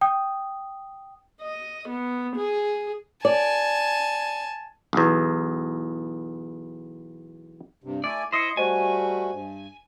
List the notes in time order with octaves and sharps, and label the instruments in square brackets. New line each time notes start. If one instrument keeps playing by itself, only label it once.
[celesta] G5 D#6
[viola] D#5
B3
G#4
[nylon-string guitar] D5 [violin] G#5 A5
[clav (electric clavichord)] B1 E2
[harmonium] G2 C3
[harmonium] A3 E4 G#5 [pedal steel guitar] D5
[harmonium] E4 E5 [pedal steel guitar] C5 D#5 [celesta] C6 C7 C#7
[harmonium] G3 A3 F#4 [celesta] C5 D#5 [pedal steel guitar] G#5
[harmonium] G2